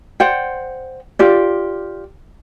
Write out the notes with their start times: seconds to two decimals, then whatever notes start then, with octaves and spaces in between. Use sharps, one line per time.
0.20 C5 D5 F#5 G5
1.19 F4 G4 D5